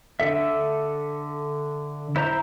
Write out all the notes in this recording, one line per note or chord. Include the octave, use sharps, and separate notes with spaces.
D3 A4 E5
E4 C5 A#5